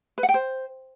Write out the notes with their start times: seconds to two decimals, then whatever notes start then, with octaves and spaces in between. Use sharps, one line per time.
0.18 B4
0.23 F#5
0.29 G5
0.34 C5